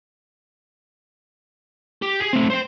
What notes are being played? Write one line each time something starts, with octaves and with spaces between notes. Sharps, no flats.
G4
G#4 G#5
A3 C4
C5 G5